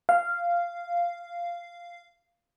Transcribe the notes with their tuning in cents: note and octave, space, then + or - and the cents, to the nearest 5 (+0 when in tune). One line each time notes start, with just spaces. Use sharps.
F5 -10